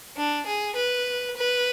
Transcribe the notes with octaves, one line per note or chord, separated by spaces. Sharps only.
D4
G#4
B4
B4